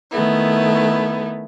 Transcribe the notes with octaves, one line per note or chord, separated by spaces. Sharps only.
D#3 A3 B3 E4